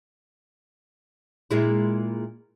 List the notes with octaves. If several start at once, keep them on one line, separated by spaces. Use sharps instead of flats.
A#2 G#3 E4